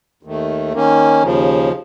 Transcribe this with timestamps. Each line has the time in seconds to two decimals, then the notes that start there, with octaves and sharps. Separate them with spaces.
0.23 D#2 D#3 A3
0.73 D#3 A#3 C#4
1.23 D#2 C#3 F3